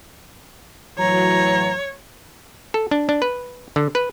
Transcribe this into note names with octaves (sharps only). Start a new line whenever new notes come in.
A2 E3 F#3 C#5 A#5
A4
D4
D4
B4
D3
B4